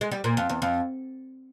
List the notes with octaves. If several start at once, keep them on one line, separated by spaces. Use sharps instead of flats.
G#3
G3
A#2
F2
E2
F2